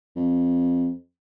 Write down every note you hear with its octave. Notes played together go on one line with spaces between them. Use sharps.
F2